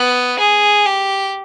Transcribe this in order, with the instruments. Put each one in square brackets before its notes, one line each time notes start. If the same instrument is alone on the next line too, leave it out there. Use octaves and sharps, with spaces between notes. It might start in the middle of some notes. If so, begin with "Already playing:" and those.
Already playing: [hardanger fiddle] B3
G#4
G4